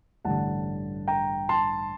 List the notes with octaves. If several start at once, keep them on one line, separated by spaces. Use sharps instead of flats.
A1 G2 D3 F#5 A5
G5 A#5
A5 C6